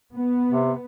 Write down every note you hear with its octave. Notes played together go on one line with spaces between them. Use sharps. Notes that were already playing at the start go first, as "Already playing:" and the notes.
B3
C3